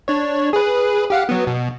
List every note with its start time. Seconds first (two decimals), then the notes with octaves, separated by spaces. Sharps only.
0.08 D4 C#5
0.53 G#4 B4
1.10 G4 F5 F#5
1.29 F#3 B3
1.47 B2